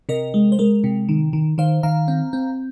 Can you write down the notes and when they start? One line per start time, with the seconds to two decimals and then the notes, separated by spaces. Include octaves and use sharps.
0.09 C3 A#4 D#5
0.34 G#3
0.52 C5
0.59 G#3 A#4
0.84 C3
1.09 D#3
1.33 D#3
1.58 D#3 C5 F5
1.83 D#3 F5 A#5
2.08 C4
2.33 C4